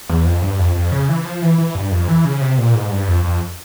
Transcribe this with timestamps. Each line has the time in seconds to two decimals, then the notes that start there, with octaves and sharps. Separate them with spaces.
0.10 E2
0.25 F2
0.42 G2
0.59 F2
0.75 F2
0.92 C#3
1.09 E3
1.25 F3
1.42 E3
1.58 E3
1.75 G2
1.92 F2
2.08 E3
2.25 C#3
2.41 C3
2.58 A#2
2.75 G#2
2.91 G2
3.08 F2
3.24 F2